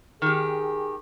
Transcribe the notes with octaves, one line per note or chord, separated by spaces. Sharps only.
D#3 G4 G#4